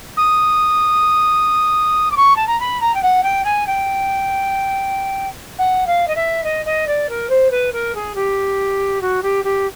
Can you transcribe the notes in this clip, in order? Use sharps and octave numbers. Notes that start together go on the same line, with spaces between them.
D#6
D6
C#6
A5
A#5
B5
A#5
G5
F#5
G5
G#5
G5
F#5
F5
D#5
E5
D#5
D#5
D5
A#4
C5
B4
A#4
G#4
G4
F#4
G4
G4